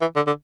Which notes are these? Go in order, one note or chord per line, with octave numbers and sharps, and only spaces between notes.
E3
D3
D3